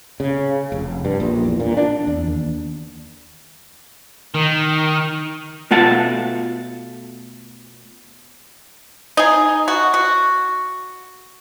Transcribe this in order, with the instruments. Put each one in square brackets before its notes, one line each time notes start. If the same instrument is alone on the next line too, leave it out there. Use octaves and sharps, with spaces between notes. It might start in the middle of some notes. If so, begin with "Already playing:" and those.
[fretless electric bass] C#3
F1
G2
A#1
E2
A#2
D4
E2
D#2
[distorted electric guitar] D#3
[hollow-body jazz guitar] B2 A3 F4 F#5 A5
[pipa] D#4 G#4
F#4
F#4